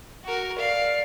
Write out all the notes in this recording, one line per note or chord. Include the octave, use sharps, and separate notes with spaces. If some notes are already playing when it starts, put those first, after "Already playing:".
F#4 A#4
D5 F5